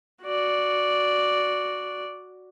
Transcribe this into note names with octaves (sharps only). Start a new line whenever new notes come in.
F#4 D5